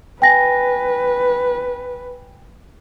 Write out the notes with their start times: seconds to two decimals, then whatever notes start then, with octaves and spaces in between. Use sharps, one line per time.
0.22 B4 G5 G#5 A#6